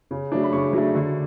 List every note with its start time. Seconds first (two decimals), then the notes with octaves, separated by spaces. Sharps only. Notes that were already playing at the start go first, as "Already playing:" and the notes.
0.11 C#3
0.32 F#3 A3 D4
0.44 B5
0.53 C#3 C#6
0.73 F#3 A3 D4
0.95 D3